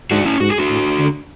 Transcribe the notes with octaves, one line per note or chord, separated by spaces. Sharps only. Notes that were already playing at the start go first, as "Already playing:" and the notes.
G#2 D4 F#4
C#4 E4
G#2 F#4
G#4
D4 F#4
A2
D3